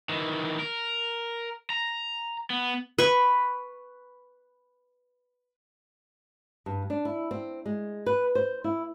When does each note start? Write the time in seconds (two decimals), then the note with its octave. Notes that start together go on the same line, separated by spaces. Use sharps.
0.09 D#3 E3
0.59 A#4
1.70 A#5
2.50 B3
2.98 B4 C#6
6.66 G2
6.90 D4
7.05 E4
7.31 C4
7.66 G#3
8.06 B4
8.35 C5
8.64 E4